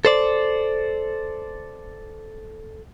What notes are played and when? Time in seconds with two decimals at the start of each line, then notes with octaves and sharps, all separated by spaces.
0.05 A4 C5 D5